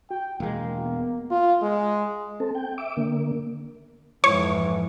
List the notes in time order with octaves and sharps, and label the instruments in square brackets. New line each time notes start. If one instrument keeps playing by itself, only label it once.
[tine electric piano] F#4 [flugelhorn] G5
[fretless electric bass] E1 G#3 [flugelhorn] A#3
[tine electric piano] B3
[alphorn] F4
G#3
[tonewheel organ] C4 A4
G5
E5 D6
D3 A#3
[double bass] F2 G#2 [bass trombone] E3 [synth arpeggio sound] C#5